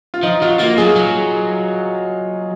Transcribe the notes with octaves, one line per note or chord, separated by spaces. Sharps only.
F4
F3 D#4
F#3 F4
A#3 F4
F#3 G#4
F#3